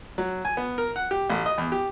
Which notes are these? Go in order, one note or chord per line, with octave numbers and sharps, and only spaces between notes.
F#3
G#5
B3
A#4
F#5
G4
A1
D#5
E2
G4